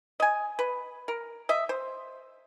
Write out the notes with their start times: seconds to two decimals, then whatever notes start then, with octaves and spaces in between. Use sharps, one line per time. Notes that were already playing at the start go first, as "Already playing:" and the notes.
0.20 D#5 G#5
0.59 B4
1.08 A#4
1.49 D#5 E5
1.69 C5